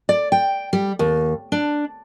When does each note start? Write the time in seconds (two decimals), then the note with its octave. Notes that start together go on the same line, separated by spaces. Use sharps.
0.09 D5
0.32 G5
0.73 G3
0.99 D#2
1.52 D4